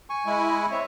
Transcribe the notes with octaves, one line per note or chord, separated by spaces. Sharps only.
G#5 C#6
G#3 E4
C4 C#5 E5